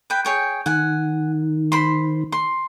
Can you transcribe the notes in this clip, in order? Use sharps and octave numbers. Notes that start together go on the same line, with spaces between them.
B4 G5
G#4 C#5 G5
D#3 F#5 G#5
C5 B5 C6
C6